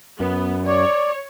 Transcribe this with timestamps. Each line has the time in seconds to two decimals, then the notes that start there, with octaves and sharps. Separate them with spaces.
0.20 F#2 B3
0.66 C#5 D5